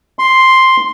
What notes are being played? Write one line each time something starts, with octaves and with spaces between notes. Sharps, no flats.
C6